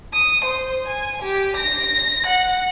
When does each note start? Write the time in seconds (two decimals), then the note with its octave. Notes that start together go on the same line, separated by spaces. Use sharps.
0.13 D#6
0.44 C5
0.87 G#5
1.22 G4
1.56 A#6
2.26 F#5